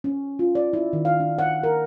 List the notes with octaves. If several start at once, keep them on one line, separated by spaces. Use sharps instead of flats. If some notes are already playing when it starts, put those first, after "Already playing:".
C#4
F4
D5
E4
D#3
F5
D4
F#5
A#4